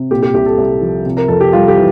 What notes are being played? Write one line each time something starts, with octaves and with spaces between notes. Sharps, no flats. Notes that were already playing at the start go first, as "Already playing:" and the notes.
Already playing: C3
A#2 G4
G4
C2 G4
A4
C2
F3
C3
A#4
F2 A4
G4
G3 F4
G4
E3